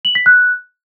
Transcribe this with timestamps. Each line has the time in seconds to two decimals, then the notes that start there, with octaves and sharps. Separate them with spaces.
0.05 F#7
0.15 B6
0.26 F#6